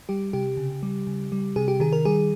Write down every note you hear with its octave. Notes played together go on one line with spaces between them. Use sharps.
G3 G4
C3 G4
C#3
G3
C#3
G3
C3 G#4
G4
D#3 G#4
A#4
G3 G#4